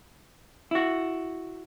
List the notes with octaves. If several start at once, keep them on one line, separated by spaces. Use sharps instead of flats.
E4 F#4